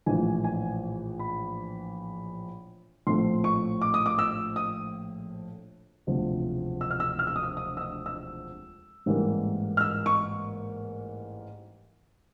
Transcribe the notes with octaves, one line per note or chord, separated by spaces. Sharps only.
A#1 A2 E3 G#5
G#5
B5
A#1 A2 F3 A3 C4 C6
C#6
D6
D#6
D6
E6
D#6
E1 D2 C3 F3
E6
F6
E6
F6
E6
D#6
E6
D#6
E6
D#6
E6
A1 G#2 E3 G3 A#3
F6
E6
C#6